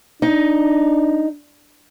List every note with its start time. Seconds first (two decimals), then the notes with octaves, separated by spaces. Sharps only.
0.22 D4 D#4